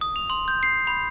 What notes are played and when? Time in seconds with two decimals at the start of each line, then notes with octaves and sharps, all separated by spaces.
0.01 D#6
0.16 F7
0.30 C6
0.48 G6
0.63 C7
0.87 B5